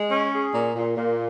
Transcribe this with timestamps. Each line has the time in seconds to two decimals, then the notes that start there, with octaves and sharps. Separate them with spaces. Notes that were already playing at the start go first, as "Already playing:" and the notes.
Already playing: G#3
0.10 C#4
0.32 G#4
0.53 A#2
0.75 A#2
0.97 A#2